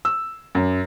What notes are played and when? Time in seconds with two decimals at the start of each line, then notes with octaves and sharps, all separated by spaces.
0.05 E6
0.55 F#2